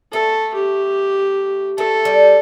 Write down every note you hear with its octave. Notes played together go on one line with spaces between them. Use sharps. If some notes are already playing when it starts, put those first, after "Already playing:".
A3 A4
G4
A3 A4
G3